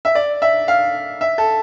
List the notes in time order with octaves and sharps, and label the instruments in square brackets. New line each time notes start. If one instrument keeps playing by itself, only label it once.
[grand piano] E5
D5
E5
F5
E5
A4